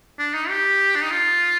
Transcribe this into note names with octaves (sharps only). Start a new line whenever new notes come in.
D4
D#4
G4
D4
D#4
F4